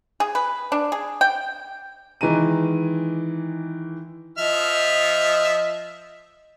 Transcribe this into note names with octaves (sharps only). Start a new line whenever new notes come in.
G#4
B4
D4
G#4
G5
D#3 E3 G#3 A#5 D#7
F3 D#5 E5 F6